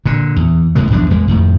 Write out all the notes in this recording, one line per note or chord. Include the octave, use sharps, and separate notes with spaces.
A#2 D3
E2
D#2 A2 C#3 G#3
A#1 E2 G2 D4
E2 G#3 A#3
F2 A2 D#3